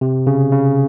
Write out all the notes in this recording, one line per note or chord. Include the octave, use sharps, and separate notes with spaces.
C3
C#3
C#3